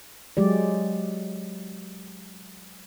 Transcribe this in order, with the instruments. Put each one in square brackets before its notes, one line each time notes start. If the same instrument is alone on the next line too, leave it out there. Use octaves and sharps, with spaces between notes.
[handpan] F#3 G#3 G4 D5